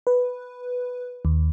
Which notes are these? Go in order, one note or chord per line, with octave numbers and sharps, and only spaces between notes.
B4
D#2